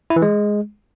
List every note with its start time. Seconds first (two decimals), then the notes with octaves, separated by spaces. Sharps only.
0.10 E4
0.16 E3
0.22 G#3